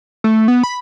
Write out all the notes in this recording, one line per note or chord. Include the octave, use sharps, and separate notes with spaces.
A3
B3
B5